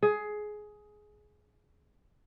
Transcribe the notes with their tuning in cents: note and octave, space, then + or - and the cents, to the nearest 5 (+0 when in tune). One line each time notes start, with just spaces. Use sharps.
G#4 +15